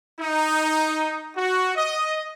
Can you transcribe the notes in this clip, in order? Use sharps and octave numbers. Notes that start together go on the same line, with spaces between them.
D#4
F#4
D#5